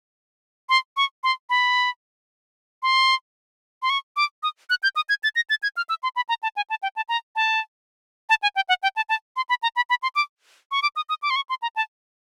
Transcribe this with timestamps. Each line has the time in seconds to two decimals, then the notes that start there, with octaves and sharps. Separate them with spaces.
0.69 C6
0.97 C#6
1.24 C6
1.50 B5
2.83 C6
3.82 C6
3.90 C#6
4.16 D6
4.43 D#6
4.70 F#6
4.83 G6
4.96 D#6
5.09 G#6
5.23 A6
5.36 A#6
5.50 A6
5.63 G#6
5.77 F6
5.89 E6
6.03 C6
6.16 B5
6.29 A#5
6.43 A5
6.56 G#5
6.70 A5
6.83 G5
6.96 A5
7.09 A#5
7.36 A5
8.29 A5
8.43 G#5
8.56 G5
8.69 F#5
8.83 G5
8.96 A5
9.09 A5
9.36 C6
9.49 B5
9.63 A#5
9.76 B5
9.90 B5
10.02 C6
10.15 D6
10.71 C#6
10.82 D6
10.96 D#6
11.09 D#6
11.22 D6
11.30 C6
11.36 C#6
11.49 C6
11.62 A#5
11.76 A5